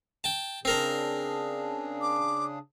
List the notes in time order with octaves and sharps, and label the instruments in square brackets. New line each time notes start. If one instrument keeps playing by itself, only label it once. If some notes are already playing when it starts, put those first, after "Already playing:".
[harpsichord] G5 A5
[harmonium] C#3 D4 G#4 [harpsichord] C4 A#4 C5
[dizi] D6